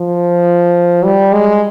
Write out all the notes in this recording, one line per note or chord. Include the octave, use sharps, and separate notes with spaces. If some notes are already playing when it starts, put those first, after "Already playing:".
Already playing: F3
G3
G#3